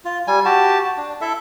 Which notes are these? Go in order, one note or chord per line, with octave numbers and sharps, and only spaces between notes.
F4
G3 G#5
F#4 G4 A5
D4
E4 A4 E5